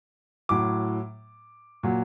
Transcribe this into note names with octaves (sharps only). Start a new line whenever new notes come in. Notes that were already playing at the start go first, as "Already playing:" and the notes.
A2 F#3 D6
A#2 F#3